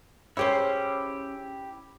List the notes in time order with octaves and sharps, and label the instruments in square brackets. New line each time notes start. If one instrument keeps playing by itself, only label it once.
[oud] C#4 G#4 C5 [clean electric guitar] E4 G4